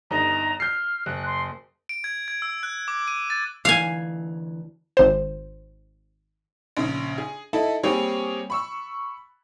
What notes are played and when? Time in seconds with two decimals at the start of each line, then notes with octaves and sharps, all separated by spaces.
0.11 G1 D#4 A#5
0.60 F6 G6 C7
1.06 F#1 F#6
1.26 C6
1.89 D7
2.04 G#6
2.28 G#6
2.42 E6
2.63 F#6
2.88 D6
3.08 D#7
3.30 A6
3.65 D2 E3 F5 G#5
4.97 G#1 C5
6.77 A#1 C#3
7.18 G#4
7.53 D#4 E4 A4 D#5 E5
7.83 G3 A#3 C4 G4 G#4 C#5
8.50 B5 C#6 E6